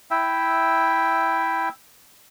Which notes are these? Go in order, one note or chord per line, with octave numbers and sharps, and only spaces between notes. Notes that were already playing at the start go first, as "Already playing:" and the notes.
E4 E5 G5